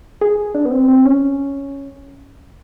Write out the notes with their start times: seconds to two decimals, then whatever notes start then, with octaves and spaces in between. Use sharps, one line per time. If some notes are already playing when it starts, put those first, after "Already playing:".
0.21 G#4
0.55 D4
0.65 B3
0.71 C4
0.88 C4
1.05 C#4